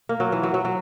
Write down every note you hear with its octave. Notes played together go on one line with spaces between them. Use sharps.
A#3
F#3
E3
F#3
F#3
F#3